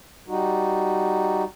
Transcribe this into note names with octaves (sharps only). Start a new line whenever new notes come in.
G3 D#4 F#4